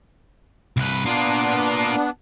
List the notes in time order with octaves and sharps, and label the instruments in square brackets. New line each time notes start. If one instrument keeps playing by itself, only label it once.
[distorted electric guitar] C2 B4
[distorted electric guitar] A#3 F4 [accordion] B3 D4